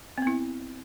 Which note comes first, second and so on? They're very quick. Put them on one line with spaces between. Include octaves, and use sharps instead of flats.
C4 B3 E4